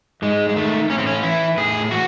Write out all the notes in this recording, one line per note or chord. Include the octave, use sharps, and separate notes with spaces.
G#2 G#3
G#3
D#3 A3
A2 C#4
C4
C#4
E3 E4
A2 G#4
E3 F#4